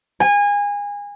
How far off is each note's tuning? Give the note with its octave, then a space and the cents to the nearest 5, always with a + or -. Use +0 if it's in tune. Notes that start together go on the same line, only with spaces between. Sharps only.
G#5 -25